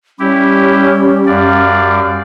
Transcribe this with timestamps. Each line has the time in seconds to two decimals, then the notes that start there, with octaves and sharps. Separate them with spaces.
0.19 G3 C#4 E4 G4
1.27 F#2 D5 F5